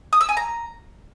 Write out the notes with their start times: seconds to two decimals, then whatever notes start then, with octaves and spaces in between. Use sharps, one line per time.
0.13 D#6
0.21 E6
0.29 G#5
0.37 A#5